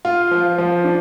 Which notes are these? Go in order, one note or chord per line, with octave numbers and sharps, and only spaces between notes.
F4
F3
F3
D4